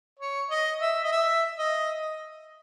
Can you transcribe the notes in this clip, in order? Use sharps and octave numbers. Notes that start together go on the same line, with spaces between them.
C#5
D#5
E5
D#5
E5
D#5